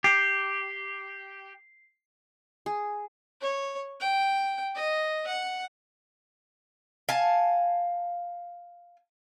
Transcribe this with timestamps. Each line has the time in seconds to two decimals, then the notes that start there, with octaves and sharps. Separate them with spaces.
0.04 G4 C7
2.66 G#4
3.42 C#5
4.00 G5
4.75 D#5
5.27 F#5
7.09 F5 G#5 A5